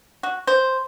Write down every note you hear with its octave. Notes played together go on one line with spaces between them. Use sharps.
F#4
C5